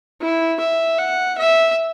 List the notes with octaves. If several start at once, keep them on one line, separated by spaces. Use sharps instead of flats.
E4
E5
F#5
E5